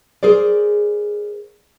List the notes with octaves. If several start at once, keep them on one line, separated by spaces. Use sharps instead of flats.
G#4 A#4 C5 D5